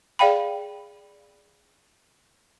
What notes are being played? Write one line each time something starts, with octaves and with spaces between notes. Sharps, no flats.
G#4 D5 F5 G5 B5